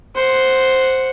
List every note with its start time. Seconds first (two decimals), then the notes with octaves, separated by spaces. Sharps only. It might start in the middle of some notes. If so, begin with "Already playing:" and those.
0.15 C5 F#5